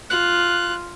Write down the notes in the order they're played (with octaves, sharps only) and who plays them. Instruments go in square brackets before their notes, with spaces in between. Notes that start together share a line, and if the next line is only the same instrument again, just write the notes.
[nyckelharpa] F4 [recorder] F#6